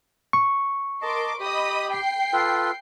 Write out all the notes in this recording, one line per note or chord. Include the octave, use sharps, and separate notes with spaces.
C#6
A#4 D#5 A5 C6 D6
G4 D#5 B5 D#6
G5 C7
F4 A4 B4